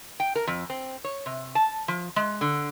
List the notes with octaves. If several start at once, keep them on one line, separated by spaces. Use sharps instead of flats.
G5
A#4
F2
C4
C#5
C3
A5
F3
G#3
D3